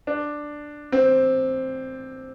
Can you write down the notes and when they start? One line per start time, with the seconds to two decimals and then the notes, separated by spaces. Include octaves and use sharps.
0.07 D4
0.92 C4